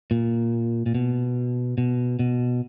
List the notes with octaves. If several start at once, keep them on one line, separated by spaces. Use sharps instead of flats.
A#2
A#2
B2
B2
B2